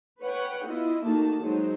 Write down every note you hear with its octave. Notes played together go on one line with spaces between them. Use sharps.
B4 C#5 F#5 G5
B3 E4 F4 D#5
D#3 A3 A#3 F#4 A5
F#3 G#3 D#4 C5